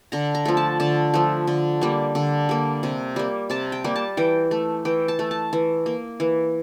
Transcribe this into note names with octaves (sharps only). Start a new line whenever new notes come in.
D3 A#5
A#5
F3 A3
A5
D3 A5
F3 A3
D3
G3 A#3
D3
G3 A#3
C3
G3 A#3
C3 A5
G5
G3 A#3
A5
E3 G5
A3
E3 G5
A5
A3
A5
E3
A#3
E3